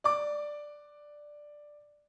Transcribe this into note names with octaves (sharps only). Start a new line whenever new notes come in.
D5 D6